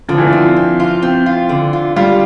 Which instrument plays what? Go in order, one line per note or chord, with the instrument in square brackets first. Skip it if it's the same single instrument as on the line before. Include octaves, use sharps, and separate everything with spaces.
[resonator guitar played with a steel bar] D3 [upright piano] F3
[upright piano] E3
F3
[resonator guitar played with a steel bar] C4
C4
F4
C4
F4
D3
F4
[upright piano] G3 [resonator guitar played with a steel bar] F4